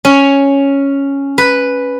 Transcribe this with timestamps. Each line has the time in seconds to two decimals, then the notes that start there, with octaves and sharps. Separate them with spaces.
0.05 C#4
1.38 B4